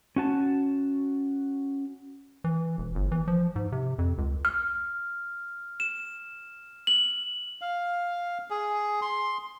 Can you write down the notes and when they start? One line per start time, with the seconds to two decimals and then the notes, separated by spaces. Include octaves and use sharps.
0.16 C#4 F#4 A5
2.44 E3
2.78 E1
2.95 G1
3.12 E3
3.28 F3
3.56 G#2
3.72 C3
3.99 F2
4.18 C#2
4.45 F6
5.80 E7
6.87 F#7
7.61 F5
8.50 G#4
9.02 C6